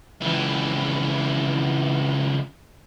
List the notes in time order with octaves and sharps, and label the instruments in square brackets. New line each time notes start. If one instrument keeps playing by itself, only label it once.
[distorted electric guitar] C#2 E3